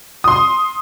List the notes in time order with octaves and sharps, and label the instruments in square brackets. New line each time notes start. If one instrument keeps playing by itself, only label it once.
[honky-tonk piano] C6 D#6